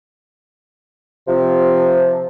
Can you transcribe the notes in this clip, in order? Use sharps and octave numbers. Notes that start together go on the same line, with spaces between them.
C3 F3